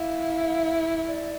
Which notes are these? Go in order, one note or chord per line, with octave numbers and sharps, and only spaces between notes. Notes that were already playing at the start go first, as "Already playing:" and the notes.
Already playing: E4 F5
E5
D5